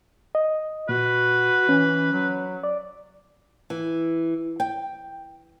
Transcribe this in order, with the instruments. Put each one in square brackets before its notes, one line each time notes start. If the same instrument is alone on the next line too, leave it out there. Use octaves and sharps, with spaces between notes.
[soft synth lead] D#5
[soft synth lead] A#2 [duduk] F#4 [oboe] B4
[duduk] E3 [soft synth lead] C#4
[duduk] F#3
[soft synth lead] D5
[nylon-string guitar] E3
G5